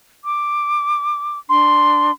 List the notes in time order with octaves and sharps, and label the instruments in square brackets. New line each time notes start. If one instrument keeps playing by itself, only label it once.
[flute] D6
[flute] D4 [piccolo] C6